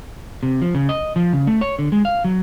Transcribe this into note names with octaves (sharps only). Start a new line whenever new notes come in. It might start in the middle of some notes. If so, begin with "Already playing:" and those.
C3
F3
C#3
D#5
F3
C#3
A3
C#5
D3
G#3
F5
F#3